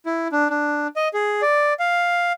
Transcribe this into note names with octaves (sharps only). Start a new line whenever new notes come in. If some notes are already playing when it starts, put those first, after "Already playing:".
E4
D4
D4
D#5
G#4
D5
F5